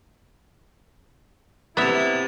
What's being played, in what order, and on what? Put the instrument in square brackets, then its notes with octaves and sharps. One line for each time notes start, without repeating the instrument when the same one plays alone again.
[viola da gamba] C3 [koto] B3 E5 [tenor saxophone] E4 [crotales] A6 F7